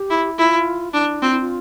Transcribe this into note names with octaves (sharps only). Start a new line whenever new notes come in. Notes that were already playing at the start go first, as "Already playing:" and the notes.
Already playing: G4
E4
E4 F4
D4 E4
C4 F4
E4
F4